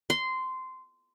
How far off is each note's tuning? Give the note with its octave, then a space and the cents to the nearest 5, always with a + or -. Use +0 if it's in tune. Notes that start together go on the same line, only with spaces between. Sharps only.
C6 -15